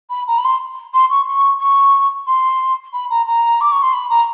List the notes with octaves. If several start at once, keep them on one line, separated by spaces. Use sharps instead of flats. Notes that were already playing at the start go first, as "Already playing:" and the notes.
B5
A#5
B5
C6
C6
C#6
C#6
C#6
C6
B5
A#5
A#5
D6
C#6
C6
B5
A#5